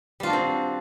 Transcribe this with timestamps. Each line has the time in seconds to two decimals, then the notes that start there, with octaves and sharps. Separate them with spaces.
0.20 G3
0.23 F4
0.27 D4
0.30 F#4
0.33 C4